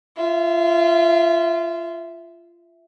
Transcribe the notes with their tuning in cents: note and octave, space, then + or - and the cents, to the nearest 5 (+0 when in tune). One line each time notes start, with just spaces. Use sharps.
F4 -25 E5 +0